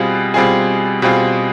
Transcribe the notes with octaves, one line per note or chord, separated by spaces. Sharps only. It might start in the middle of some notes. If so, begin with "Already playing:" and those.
Already playing: B2 G3 C4 F4 G#4
B2 G3 C4 F4 G#4
B2 G3 C4 F4 G#4